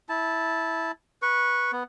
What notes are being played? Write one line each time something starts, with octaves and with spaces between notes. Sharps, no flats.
E4 A5
B4 C#6
B3